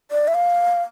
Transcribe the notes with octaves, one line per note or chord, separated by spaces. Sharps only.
D5
E5
F5